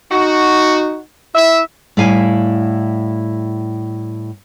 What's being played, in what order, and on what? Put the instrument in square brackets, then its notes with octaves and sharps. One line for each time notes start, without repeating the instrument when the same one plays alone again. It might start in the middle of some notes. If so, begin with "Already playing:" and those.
[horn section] D#4 F#4
E4 E5
[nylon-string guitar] A2 G3 E4 F5 G#5